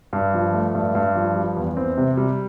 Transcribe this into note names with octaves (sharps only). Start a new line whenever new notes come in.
G2
F3
A3
G2
G2
F3
G3
E2
C4
C3
G3